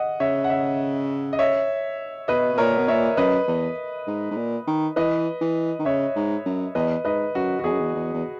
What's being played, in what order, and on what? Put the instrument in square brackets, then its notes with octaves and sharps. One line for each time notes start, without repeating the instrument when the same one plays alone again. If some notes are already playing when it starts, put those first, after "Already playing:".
Already playing: [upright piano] D#5 F#5
[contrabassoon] C#3 [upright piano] C#5 E5
[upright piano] F#5
C#5 E5
D#5
C#5 E5
[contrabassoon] B2 [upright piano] B4 D#5
[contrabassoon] B2
[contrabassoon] A#2 [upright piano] A#4 C#5
[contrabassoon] B2
[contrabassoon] A#2 [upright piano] C#5 E5
[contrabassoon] F#2 [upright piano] B4 D#5
[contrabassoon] E2
G#2
G#2
A#2
D#3
[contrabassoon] E3 [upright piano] B4 D#5
[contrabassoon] E3
D#3
[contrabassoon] C#3 [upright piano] C#5 E5
[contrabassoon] G#2
F#2
[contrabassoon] E2 [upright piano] B4 D#5
[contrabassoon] G#2 [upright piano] B4 D#5
[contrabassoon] F#2 [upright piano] F#4
[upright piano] F#4
[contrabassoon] E2 [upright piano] G#4
[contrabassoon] F#2
E2
E2
E2